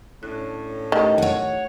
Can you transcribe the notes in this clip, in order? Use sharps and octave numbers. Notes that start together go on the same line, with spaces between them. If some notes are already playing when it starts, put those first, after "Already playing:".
A2 C#4 D4 F#6
D#3 A3 G4
C#5 F#5